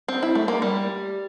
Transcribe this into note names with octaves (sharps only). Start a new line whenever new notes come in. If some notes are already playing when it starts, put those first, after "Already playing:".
C4
E4
A3
A#3
G3